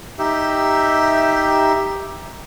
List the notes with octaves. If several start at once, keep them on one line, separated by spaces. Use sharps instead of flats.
D#4 G4 E5